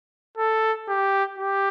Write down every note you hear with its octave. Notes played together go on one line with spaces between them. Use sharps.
A4
G4
G4